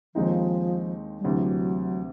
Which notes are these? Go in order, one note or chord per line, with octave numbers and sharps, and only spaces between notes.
D#2 D#3 F3 G#3 C4 D#4
G3
D2 C3 E3 F#3